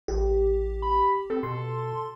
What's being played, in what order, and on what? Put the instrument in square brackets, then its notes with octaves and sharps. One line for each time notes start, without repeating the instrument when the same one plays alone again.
[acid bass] A1 [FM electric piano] G4
[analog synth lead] B5
[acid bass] C4 [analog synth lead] A4
[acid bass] B2 [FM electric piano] C6